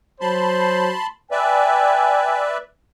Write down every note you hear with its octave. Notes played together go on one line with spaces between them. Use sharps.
F#3 C5 A5 B5 C6
B4 D5 E5 G5 G#5